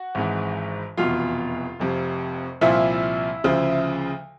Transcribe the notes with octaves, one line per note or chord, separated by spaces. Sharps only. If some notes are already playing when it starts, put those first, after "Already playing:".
Already playing: F#4 F#5
G#1 G#2 E3
F1 E2 B2 F4 F5
F1 F2 C3
C2 A#2 F3 E4 E5
D2 C#3 F3